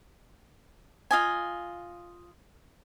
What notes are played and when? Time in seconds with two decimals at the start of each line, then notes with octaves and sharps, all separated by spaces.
1.11 F4 D#5 G#5